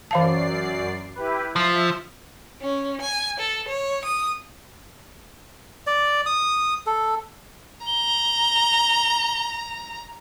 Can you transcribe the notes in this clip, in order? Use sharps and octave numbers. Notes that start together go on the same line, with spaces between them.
F#2 E3 D5 F5 A5 C7
E4 G4 B4
F3 E5
C#4
G#5
A4
C#5
D#6
D5
D#6
A4
A#5 G7